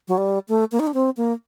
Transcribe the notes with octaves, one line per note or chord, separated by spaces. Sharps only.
F#3
G3
A3
A#3
D#4
D4
C4
A#3